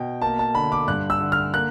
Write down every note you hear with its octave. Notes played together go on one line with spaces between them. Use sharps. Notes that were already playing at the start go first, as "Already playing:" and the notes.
Already playing: B2 G5
A#3 A5
A5
D3 B5
D6
G2 F#6
E6
D3
F6
A#3 F#6